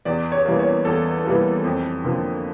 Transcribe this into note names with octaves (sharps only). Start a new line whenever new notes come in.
E2 D5
C#5
E3 G3 A#3
C#5
E2 A4
E3 G3 A#3
F2
D3 F3 A#3